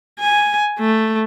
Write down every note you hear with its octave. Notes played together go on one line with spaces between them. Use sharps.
G#5
A3